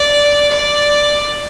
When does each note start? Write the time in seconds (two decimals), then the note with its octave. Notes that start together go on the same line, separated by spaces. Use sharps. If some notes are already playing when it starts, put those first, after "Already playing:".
Already playing: D5
0.51 D5